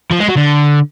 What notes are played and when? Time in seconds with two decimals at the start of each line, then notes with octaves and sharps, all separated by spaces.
0.12 F3
0.20 G#3
0.29 F#3
0.37 D3